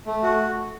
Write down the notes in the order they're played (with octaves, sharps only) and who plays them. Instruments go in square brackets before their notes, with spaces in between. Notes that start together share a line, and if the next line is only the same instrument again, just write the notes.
[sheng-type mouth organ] A3
F#4